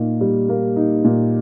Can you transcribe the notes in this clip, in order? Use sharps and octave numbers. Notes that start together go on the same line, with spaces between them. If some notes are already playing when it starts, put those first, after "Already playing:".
Already playing: A#2 A#3 D#4
G3
A#3
D#4
A#2